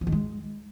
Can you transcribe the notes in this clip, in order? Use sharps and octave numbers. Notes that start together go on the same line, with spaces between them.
F3
D#3
G#3